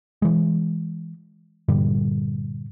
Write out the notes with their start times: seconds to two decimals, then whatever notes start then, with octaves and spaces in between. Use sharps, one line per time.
0.22 E3 G#3
1.68 G2 A#2 D3 G3